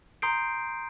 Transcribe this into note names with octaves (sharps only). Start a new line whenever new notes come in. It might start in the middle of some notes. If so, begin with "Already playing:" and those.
A#5 C6 D#6 G6 C7 D7